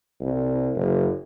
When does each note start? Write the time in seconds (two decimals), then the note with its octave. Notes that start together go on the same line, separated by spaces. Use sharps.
0.20 C2
0.76 F#1